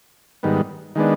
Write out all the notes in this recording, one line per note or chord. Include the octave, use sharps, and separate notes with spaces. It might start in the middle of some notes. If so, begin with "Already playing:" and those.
G#2 D#3 G3 B3
D#3 G#3 B3 D4